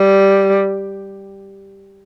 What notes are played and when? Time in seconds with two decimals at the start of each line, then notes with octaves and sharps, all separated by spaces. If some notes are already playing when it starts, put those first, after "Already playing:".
Already playing: G3